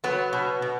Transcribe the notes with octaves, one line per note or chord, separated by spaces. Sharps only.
F#3 B3
B2
B2